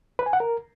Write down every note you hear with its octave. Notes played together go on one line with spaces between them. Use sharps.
B4
G#5
F#5
A#4